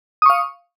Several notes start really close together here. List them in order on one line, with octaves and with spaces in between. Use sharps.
D#6 C#6 F5